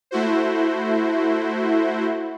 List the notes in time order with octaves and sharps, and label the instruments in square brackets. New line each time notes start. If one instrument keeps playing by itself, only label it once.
[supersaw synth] A3 E4 F#4 C5